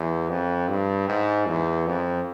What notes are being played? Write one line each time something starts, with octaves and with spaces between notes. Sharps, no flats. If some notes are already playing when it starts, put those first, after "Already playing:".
Already playing: E2
F2
G2
G#2
E2
F2